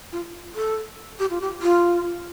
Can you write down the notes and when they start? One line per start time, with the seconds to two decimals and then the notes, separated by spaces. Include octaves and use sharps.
0.12 F4
0.55 A4
1.19 G4
1.30 F4
1.41 G4
1.62 F4